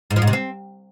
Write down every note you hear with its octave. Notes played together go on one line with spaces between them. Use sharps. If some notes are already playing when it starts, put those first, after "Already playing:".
G#2
F3
G#2
C3
C4